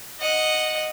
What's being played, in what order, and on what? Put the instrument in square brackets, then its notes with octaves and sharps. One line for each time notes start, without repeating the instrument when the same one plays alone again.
[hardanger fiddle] D#5 F#5